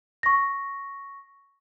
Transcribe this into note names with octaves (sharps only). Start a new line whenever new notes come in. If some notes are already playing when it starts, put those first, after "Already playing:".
C#6 A#6